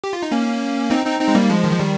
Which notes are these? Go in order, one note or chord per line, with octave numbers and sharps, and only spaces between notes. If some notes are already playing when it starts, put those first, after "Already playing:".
G4
F4
D#4
A#3 C#4
C4 D#4
C4 D#4
C4 D#4
G#3
G3 A#3
F3 G#3
D#3
F3
D#3 G3